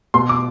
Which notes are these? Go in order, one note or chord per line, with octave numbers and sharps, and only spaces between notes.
B2 C6
D6